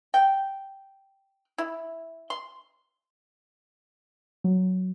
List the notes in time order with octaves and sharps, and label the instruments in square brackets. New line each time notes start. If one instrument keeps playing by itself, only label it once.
[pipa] G5
E4
C6
[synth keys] F#3